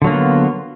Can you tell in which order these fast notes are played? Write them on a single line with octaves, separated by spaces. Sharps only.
D3 F#3 A#3 F4 B3